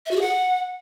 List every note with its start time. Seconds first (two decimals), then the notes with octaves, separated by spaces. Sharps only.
0.06 E5
0.11 F#4
0.16 G#4
0.21 F#5